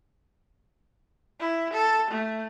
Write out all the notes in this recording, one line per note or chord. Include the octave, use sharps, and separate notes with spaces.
E4
A4
A3